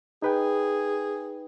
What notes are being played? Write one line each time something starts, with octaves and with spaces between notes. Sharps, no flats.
D#4 G#4 B4 G5